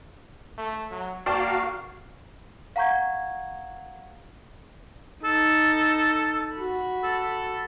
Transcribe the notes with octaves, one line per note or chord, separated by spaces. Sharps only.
A3
F#3
A#3 F#4 D5 F5 G5 A5
F5 F#5 A#5 C#6 G6 G#6
D#4 A4
F#4 B5
A4